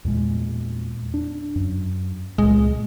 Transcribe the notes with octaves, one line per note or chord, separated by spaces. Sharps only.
E2 A#2 G#3
D4
F#2
C#2 A#2 G#3